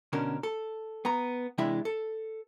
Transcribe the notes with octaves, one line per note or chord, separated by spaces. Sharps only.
B2 D3 C#4 D4 A#4
A4
B3 A#5
C3 E3 G#3 D4 E4 E5
A4